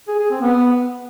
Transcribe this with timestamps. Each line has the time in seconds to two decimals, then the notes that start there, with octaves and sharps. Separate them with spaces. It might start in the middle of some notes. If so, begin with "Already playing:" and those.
0.08 G#4
0.19 G#4
0.30 C4
0.42 B3